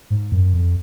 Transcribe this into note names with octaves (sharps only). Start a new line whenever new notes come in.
G#2
F#2
F2